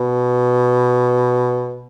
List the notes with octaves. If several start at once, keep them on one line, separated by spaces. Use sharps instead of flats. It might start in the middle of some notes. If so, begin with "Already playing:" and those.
Already playing: B2